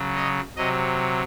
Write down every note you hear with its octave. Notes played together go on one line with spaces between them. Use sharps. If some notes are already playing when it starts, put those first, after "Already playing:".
Already playing: C#3 F#3
D#5
C3 F#3 D#5